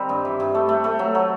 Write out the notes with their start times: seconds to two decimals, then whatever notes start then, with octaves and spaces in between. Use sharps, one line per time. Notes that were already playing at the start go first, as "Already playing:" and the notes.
Already playing: D#3 G3 C4
0.09 G2
0.25 E3
0.40 G2
0.54 A3
0.69 A3
0.84 A3
0.99 F#3
1.15 F#3